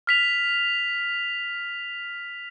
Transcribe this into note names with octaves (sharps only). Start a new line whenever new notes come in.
F6 B6 F7